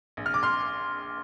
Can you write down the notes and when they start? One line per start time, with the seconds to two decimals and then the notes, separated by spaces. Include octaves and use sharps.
0.17 A#1
0.26 F6
0.34 D6
0.43 C6 F6